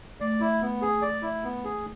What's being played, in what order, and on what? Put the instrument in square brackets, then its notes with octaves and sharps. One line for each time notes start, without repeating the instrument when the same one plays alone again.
[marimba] A3 [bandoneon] D5
[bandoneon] E4
B3
G#4
D5
E4
B3
G#4